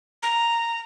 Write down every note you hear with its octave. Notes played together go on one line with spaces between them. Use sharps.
A#5